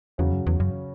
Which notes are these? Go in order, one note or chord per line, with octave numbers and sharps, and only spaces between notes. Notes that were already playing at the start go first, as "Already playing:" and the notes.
E2 C#3 F#3 C#4 F#4
F#2
E2
F#2